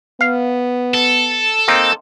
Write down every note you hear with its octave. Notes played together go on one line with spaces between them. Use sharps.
B3 F5
A4
A#3 C4 D#4